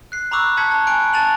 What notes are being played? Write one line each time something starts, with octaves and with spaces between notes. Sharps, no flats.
F#6 C7
A#5 B5 C#6 D6 E6 F#6
A5 C6 G#6 B6 C#7
A5 A#5
G#5 B5 F#6 D7
A5 A6 D#7 F7 F#7